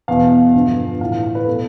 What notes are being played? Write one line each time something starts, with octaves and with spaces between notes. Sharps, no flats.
E2 B2 F5
G2 D3 F3
A2 E3 F5
F5
F5
B4
B2 A4